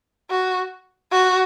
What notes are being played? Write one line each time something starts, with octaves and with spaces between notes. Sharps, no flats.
F#4
F#4